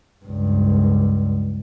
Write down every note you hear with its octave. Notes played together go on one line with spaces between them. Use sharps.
C#2 G2